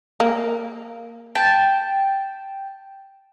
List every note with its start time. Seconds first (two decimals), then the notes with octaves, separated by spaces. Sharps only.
0.20 A#3
1.35 G5 A5